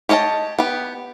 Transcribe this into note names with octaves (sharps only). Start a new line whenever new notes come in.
G4 C#5 D#5 E5 A5
B3 G4